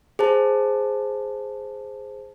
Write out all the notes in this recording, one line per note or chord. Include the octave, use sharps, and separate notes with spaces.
G#4 C5 A5